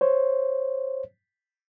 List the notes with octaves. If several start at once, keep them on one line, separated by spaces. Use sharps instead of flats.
C5 C#5